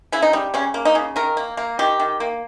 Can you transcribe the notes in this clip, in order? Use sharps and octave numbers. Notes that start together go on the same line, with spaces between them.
C#3 E4
D#4
G3
C#3 C#4
A#3
D#4
C#3
D#3 A#4
A#3
A#3
D#3 G4
D#3
A#3